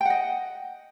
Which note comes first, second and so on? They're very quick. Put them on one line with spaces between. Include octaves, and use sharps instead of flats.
G5 F#5 D#5